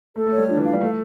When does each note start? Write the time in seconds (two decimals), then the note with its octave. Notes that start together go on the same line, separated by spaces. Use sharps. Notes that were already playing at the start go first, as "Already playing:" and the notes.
0.15 A3 A4
0.27 A3
0.32 C#5
0.38 G3
0.48 F3 D4
0.57 E3
0.65 F5
0.73 G3
0.81 A3 A4